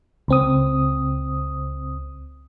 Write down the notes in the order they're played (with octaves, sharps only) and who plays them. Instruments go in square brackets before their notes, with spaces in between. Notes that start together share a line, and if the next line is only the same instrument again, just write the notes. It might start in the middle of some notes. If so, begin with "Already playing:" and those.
[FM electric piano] C#2 C4 D#6